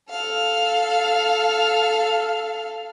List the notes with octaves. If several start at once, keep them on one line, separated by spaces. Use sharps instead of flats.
A4 F5